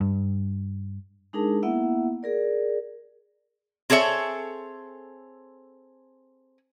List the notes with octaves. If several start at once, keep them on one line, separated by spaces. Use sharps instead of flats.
G2
G#3 D4 D#4 G#4 A#4 A5
A#3 B3 E4 E5 F#5
G#4 A#4 D5
C4 G#4 A4 C#5 E5